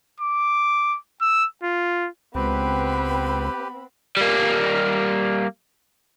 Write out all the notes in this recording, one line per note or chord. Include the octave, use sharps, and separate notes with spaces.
D6
E6
F4
C#2 B3 C4 G4 B4 B5
G3 A#3